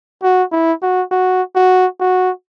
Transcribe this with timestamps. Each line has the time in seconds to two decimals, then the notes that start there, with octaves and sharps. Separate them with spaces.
0.23 F#4
0.52 E4
0.82 F#4
1.11 F#4
1.55 F#4
2.00 F#4